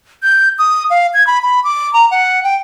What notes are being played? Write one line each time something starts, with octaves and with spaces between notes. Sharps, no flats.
G6
D#6
F5
G#6
B5
B5
D6
A#5
F#5
G5